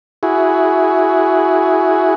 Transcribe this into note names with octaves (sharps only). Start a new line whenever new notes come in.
E4 F#4 G#4